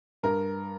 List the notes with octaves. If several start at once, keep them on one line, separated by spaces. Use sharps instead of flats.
G2 A#4